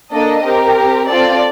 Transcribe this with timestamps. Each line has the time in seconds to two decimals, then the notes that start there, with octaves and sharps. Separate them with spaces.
0.13 A#3 D4 A4 D#5
0.45 C4 G4 A#4
0.77 C4 G4
1.09 C4 F4 A4 D5